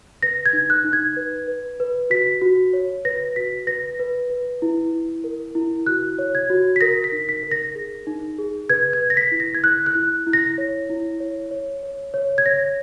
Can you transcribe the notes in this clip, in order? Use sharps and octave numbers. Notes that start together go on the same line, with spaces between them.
B4 A#6
G#6
D#4
F#6
D#4
G#6
B4
B4
B4
F#4 B6
F#4
C#5
B4 A#6
F#4 B6
B4 A#6
B4
B4
E4
E4
A#4
E4
F#4 F#6
C#5
G#6
F#4
B6
A#4 A#6
B6
D#4
B6
A#4
A#6
G#4
D#4
G#4
B4 G#6
G#6
B4
A#6
B6
E4
A#6
G#6
E4 F#6
F#6
E4
E4
A#6
C#5
E4
C#5
C#5
C#5
C#5
G#6
C#5 A#6